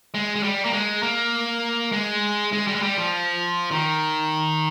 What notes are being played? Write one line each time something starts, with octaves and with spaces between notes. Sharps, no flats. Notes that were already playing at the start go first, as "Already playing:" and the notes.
G#3
G#3
G3
A#3
G#3
A#3
G#3
G#3
G3
G#3
G3
F3
D#3